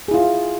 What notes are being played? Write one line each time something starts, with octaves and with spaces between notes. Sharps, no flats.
E4 F4 G#4